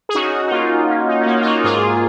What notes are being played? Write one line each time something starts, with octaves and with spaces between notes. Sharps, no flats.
G#4
C#4 D#4 F#4
D#4
A#3 C#4 F4
A#3 C#4
D#4
C#4
A#3 D#4
F4
D#4 F#4
G#2 F4 G#4